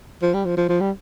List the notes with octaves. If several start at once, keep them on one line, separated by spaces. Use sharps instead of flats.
F3
G3
F3
F3
F3
G3